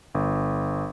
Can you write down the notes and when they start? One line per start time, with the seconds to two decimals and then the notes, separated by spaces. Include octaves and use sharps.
0.14 G1